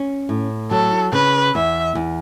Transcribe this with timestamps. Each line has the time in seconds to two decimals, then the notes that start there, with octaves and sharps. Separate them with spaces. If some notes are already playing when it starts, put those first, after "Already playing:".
Already playing: C#4
0.29 A2
0.71 F#3 A4
1.13 C#3 B4
1.55 E2 E5
1.95 E2